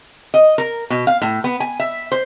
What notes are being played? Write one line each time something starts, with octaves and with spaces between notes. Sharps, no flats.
D#5
A#4
B2
F5
A2
B3
G#5
E5
C5